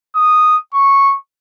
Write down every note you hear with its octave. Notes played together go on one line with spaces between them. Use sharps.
D#6
C#6